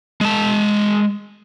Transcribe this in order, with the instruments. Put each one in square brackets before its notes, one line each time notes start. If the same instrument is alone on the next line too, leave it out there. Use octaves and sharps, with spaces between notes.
[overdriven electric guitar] G#3 A5